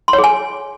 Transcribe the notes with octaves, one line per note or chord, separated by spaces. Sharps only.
C6
C#5
G#4
G#5